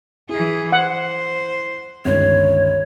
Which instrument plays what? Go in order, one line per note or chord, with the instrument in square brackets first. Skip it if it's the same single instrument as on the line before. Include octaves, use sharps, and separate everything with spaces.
[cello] E3 G#4 [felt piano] E4
[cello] C5 [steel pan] F#5
[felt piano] G1 C#2 D#3 [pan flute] C#5